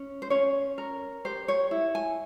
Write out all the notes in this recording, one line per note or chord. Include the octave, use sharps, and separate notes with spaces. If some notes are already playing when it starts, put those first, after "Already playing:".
Already playing: C#4
C5
C#4 C#5
A#4
G4 C5
C#5
E4
G#5